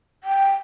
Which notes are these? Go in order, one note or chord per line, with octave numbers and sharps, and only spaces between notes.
G5